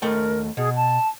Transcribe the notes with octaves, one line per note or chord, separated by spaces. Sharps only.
D#2 A3 A#4 G5
B2 G#4
A5